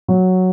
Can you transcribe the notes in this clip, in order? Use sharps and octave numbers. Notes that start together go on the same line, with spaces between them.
F#3